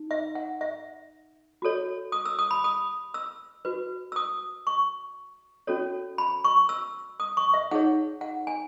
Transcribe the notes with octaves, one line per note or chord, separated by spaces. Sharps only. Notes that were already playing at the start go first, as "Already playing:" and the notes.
Already playing: D#4
E5
F#5
E5
F#4 A4 C#5
D#6
E6
D#6
B5
D#6
E6
F#4 B4
E6
D#6
C#6
C#4 F#4 A4 C#5
B5
C#6
E6
D#6
C#6
E5
D#4 G#4 C#5 F#5
F#5
G#5